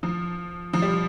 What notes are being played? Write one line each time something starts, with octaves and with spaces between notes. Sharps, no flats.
F3
F3
G3